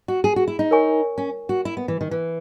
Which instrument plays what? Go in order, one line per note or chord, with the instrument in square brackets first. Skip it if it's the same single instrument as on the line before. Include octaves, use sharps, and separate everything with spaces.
[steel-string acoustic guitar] F#4
G#4
F#4
E4
D#4
[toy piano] A#4 C#5 G#5 C#6
[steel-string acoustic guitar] C#4
F#4
E4
B3
E3
D#3
E3